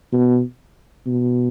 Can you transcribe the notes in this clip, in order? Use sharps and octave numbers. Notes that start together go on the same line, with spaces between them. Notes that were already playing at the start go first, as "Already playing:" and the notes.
B2
B2